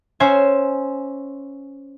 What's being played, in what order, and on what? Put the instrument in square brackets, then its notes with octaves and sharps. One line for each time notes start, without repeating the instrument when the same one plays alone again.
[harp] C#4 C5 E5 G#5